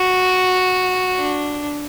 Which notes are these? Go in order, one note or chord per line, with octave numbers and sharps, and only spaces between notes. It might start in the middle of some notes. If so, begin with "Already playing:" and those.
Already playing: F#4
D4